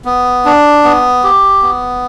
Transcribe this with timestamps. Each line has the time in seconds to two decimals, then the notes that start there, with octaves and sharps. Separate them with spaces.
0.05 B3
0.45 D4
0.84 B3
1.24 G4
1.62 B3